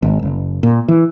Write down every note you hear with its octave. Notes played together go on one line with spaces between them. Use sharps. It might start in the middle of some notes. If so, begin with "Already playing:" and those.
G#1
F#1
A#2
E3